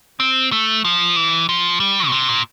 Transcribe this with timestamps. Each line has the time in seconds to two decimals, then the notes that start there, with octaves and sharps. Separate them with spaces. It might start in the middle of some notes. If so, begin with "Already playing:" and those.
0.20 C4
0.52 A3
0.85 F3
1.16 E3
1.49 F3
1.80 G3
2.09 A#2
2.12 C3
2.29 A#2